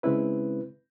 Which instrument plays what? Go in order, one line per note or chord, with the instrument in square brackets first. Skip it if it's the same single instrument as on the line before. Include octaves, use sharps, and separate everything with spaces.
[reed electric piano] C#3 G#3 C4 C#4 E4 B4